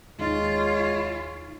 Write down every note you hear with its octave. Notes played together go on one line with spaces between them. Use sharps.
D#2 G#3 D#4 F4 C#5 A6